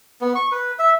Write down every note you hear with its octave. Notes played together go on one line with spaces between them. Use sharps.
B3
C#6
B4
E5